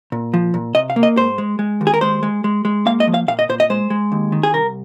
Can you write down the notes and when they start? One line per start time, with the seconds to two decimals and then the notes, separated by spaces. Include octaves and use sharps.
0.12 A#2
0.34 F3
0.54 A#2
0.75 C3 D#5
0.90 F5
0.96 A#3
1.03 D#5
1.17 G#2 C5
1.38 G#3
1.59 G#3
1.81 D#2
1.87 G#4
1.94 A#4
2.01 G#3 C5
2.23 G#3
2.44 G#3
2.65 G#3
2.86 A#3 F5
3.00 D#5
3.07 F3
3.14 F5
3.28 A#2 F5
3.39 D#5
3.49 A#2 C5
3.60 D#5
3.70 G#3 C5
3.90 G#3
4.12 D#2
4.32 D#3
4.43 G#4
4.53 C2 A#4